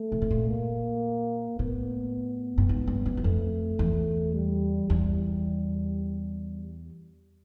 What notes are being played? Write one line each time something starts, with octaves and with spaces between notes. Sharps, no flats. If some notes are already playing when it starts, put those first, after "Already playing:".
Already playing: A3
B2
A2
A#2
A#3
A2 B3
G2
G#2
G2
F#2
F#2
F2 A3
E2
G3
E2 G3